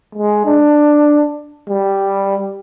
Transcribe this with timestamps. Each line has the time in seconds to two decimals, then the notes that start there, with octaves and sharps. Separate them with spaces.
0.15 G#3
0.45 D4
1.69 G3